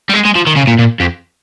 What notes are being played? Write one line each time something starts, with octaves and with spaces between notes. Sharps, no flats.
G3
G#3
G#3
F3
D#3
C#3
A#2
A#2
F2